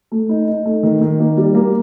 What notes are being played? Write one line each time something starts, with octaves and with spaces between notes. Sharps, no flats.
A3
D#4
D#4
A3
D#3
D#3
A#3
G3
A#3